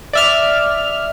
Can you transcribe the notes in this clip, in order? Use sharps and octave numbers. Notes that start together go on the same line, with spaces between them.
D5 E5 F6